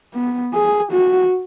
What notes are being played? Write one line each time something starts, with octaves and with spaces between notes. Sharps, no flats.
B3
G#4
F#4